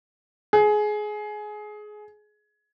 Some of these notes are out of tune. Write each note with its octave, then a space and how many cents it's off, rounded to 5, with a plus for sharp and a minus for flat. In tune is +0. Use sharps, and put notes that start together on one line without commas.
G#4 +20